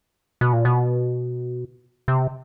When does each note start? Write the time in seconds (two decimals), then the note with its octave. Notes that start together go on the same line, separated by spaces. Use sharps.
0.41 B2
0.53 A#2
0.65 B2
2.08 C3